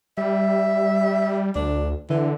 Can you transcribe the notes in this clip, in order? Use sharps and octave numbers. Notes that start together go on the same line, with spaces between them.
G3 E5
D2 D4
D3 E3